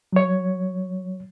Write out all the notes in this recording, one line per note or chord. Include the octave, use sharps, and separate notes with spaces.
F#3 C#5